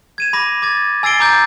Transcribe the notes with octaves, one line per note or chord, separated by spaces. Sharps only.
G#6 D#7 E7
B5 D6 A#6
D6 G#6 A6
G#5 E6 A6 C7 D7 G7
G#5 A#5 D6 G6 A6 D7